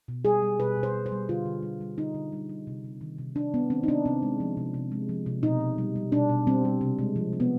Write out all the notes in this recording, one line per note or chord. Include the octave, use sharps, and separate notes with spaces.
B2
G3 G#4
G3
B2 B4
B2
C5
G3
C5
G3
D3 F4
D3
G3
G3
D3 D#4
D3
G3
G3
C3
G3
D#3
C3
C3 D4
G3 B3
D#3 C4
D#4
C3 D4
C3 C4
G#3
F3
C3
C3
G#3
F3
C3
B2 D#4
B2
G3
G3
B2 D4
B2
G3 C4
G3
C3
G#3
F3
C3
B3